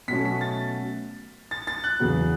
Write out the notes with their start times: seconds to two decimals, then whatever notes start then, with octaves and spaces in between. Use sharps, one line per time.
0.08 B2 F#3 A3 C#4 B6
0.25 B6
0.41 A6
1.51 A6
1.67 A6
1.84 F#6
2.00 E2 C#3 F#3 B3